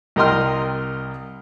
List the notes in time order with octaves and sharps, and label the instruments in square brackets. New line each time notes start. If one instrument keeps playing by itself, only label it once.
[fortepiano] C2 A#4 D#5 G5 C6 F6